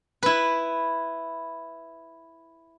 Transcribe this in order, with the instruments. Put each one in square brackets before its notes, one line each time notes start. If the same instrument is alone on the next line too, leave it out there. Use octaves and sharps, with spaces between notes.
[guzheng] E4 B4